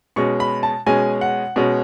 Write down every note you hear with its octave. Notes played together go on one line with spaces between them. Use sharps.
B2 G#3 C#4 C#6
B5
A5
B2 G#3 C#4 G#5
F#5
B2 G#3 C#4